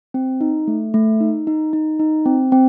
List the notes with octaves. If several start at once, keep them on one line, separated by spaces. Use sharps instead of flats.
C4
D#4
A3
A3
D#4
D#4
D#4
D#4
C4
C4